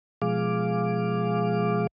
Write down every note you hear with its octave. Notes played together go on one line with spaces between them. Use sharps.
B2 F3 G#3 G#4 F5 D6